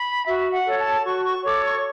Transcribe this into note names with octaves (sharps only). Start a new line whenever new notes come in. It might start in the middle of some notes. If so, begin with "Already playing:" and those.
Already playing: B5
F#4 E5
F#5
A4 C#5
A5
F#4 C#6
C#6
A4 C#5 D6
C#6